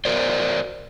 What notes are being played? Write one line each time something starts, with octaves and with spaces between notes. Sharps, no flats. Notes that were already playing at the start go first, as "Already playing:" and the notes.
F#4 A#4 C5 D5